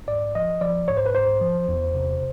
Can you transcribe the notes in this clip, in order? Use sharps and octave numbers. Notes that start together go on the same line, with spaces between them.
G#2 D5
F3 D#5
F3 D5
G#2 C#5
C5
B4
G#2 C5
F3
E2
C3